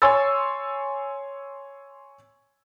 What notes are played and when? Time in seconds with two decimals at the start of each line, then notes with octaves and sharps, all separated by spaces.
0.02 C#5 G#5 C6 C#6 E6 A6